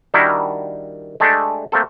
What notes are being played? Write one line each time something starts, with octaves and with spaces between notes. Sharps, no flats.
D#3 G3 D4 E4 F#4 A#4
G#3 A3 D4 G4 A4
A3 A#3 C4 A4